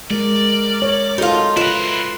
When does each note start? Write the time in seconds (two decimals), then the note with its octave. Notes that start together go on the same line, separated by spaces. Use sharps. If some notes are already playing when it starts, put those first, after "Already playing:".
0.11 G#3 A#4 D5
0.82 C#5
1.18 D#4 F4 F#4 A4
1.57 E4 F4 A#4 B4 C6